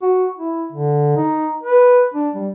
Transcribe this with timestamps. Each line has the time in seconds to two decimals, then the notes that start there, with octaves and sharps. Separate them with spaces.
0.02 F#4
0.38 E4
0.72 D3
1.17 D#4
1.63 B4
2.14 D4
2.35 G3